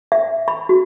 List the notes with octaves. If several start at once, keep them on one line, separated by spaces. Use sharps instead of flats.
E5
B5
F#4